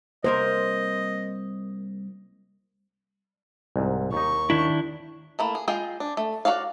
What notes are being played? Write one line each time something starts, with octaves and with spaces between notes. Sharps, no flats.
C2 A#3 A#4 C5 D#5
C2 G#2
D#2 D#4 C#6
D#3 D4 E4
A3 A#3 E4
G#4
G#3 F4 G#4 G5
D4
A3
F#4 G#4 C#5 D5 F5